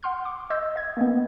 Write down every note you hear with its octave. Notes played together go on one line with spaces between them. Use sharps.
F#5 G5 C6 F6 G6
C#6 D6
D#5 C6 E6 G6 A6
D#5 G#6
A#3 B3